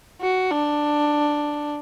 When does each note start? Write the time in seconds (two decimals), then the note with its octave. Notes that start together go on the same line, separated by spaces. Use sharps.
0.21 F#4
0.51 D4